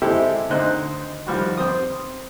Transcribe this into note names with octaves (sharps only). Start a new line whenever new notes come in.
G#3 C4 E4 G4 A4
D2 D#3 D#4 C5 F#6
D#3 F3 G3 F#4
C4 C5 D#6